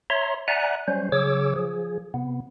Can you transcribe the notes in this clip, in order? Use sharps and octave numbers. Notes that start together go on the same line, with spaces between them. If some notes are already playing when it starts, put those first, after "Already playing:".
C#5 E5 A#5 C6
D5 E5 F#5 G#5 A#5 F#6
F#3 G3 C#4 C5
C#3 F#3 G#4 C#5 D6 E6
F3 G#4
C3 B3